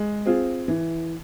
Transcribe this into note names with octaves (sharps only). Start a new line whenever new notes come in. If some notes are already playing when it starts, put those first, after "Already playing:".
Already playing: G#3
C4 F4 G#4
E3